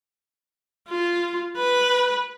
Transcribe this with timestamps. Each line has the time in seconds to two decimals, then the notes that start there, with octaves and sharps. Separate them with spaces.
0.88 F4
1.57 B4